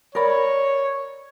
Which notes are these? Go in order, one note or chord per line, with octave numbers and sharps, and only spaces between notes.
A#4 C#5 D5 B5